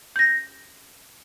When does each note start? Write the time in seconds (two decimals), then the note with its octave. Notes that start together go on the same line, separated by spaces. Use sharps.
0.16 G6 A#6